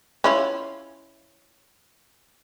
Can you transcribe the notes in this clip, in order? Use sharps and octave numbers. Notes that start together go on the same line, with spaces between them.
C#4 E4 F4